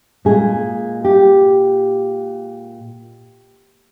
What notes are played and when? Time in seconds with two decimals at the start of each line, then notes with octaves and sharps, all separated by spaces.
0.25 A#2 G#3 G#4
1.05 G4